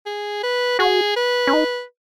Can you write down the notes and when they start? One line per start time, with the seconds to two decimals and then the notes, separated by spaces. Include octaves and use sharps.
0.06 G#4
0.43 B4
0.79 F#4 G#4
1.16 B4
1.47 C#4
1.53 D#4